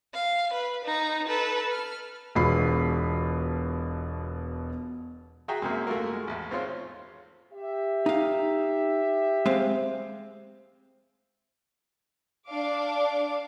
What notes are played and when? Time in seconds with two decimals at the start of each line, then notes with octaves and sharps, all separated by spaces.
0.14 F5
0.53 B4
0.85 D#4 A#5
1.27 A4 B4
1.71 F6
2.35 E1 B2 F4 B5 C7
5.48 F#4 G#4 E5 G5 A#5
5.62 F#2 C3 G#3 A#3
5.87 A3 A#3 F4 F#4 A#4
6.13 G#3
6.27 A1 E2
6.51 G#1 C4 F4 C#5 C6
7.54 G4 E5
8.06 D#4 F5
9.46 G#3 C4 F5
12.47 D4 F5 D6